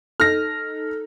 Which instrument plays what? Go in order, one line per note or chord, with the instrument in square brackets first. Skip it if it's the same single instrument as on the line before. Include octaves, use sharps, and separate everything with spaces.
[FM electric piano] D#4 A4 [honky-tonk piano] F6 A#6